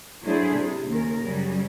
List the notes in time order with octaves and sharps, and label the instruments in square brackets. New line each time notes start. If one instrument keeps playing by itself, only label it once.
[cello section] F#3 A3 D4 E4 G#4 C5
C3
D#2 C#3 A#4
F#2 C#3 F#3 G3